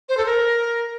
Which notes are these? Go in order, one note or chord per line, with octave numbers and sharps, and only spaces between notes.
C5
A4
A#4